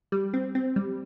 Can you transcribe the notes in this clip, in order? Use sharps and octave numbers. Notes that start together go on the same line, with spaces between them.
G3
C4
C4
G3